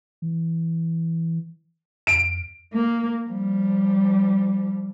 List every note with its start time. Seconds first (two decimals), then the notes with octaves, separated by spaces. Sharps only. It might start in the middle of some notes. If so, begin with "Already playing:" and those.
0.22 E3
2.07 F2 D7
2.73 A#3
3.27 F3 G3